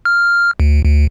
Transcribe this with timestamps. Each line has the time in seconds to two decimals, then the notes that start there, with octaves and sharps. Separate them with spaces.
0.05 F6
0.60 D2
0.84 D2